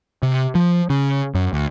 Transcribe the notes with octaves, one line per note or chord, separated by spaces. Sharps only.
C3
F3
C#3
F#2
D2